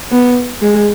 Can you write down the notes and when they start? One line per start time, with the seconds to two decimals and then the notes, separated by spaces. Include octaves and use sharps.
0.12 B3
0.62 G#3